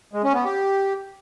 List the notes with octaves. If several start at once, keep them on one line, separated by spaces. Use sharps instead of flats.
G#3
C#4
B3
G4